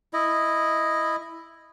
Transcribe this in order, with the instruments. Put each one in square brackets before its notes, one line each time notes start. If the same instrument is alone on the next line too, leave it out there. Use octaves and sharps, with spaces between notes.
[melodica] E4 D#5